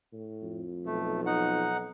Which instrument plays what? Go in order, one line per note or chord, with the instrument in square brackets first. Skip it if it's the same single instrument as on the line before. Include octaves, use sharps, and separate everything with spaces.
[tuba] A2
[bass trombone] F2
[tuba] B1 [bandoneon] A3
[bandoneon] D#4 F#5